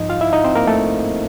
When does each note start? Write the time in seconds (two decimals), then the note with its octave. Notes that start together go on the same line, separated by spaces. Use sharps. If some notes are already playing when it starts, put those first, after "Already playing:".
Already playing: G#2 F3 D#4 D#5
0.09 F4 F5
0.21 E4 E5
0.33 D#4 D#5
0.44 C4 C5
0.56 A#3 A#4
0.67 A3 A4